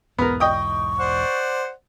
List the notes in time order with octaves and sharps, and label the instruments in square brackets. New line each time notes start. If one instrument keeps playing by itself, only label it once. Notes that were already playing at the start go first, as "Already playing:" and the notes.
[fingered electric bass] B1 E2 G#2 [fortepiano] B3 A#4
[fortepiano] D#5 G5 D#6 [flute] C#6
[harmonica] C5 D5 F#5